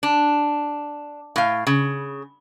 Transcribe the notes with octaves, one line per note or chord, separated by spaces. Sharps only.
D4
A2 F5
C#3